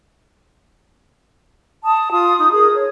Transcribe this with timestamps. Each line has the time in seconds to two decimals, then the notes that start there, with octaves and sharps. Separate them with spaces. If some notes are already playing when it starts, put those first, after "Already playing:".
1.84 A5 D#6
2.11 F4 D#6
2.38 D#4 D#6
2.52 G#4 A#4 D#6
2.73 C#5